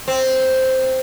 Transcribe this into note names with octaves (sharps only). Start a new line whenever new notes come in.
C4